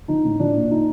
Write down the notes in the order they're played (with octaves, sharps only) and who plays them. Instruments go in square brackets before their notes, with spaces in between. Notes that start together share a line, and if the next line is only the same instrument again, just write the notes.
[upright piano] F3 D#4
A2
F3 D4
A#2
A#2 D#4